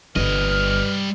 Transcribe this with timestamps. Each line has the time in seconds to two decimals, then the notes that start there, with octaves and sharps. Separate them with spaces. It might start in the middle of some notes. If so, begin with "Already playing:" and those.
0.16 G1 G3 B4 D#5 F6